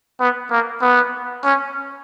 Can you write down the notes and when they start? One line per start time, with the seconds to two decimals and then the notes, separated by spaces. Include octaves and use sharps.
0.20 B3
0.51 A#3
0.81 B3
1.44 C#4